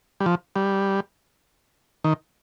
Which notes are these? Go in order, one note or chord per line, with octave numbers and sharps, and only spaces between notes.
G3
F3
G3
D#3